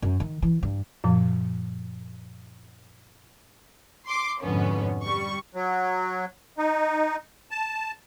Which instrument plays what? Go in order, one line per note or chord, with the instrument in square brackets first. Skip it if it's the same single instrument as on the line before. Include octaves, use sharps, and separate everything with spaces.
[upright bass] F#2
D#3
E3
G2
[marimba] F#2 A#2 F3
[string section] C6 D6
F2 G#2 B2 D3 B3 C#4
G3 C#6
[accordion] F#3
D#4
A5